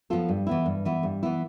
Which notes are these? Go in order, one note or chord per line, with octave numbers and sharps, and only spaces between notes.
F3 B3 F4 A4
G2
E3 B3 E4
G2
E3 B3 E4
G2
E3 B3 E4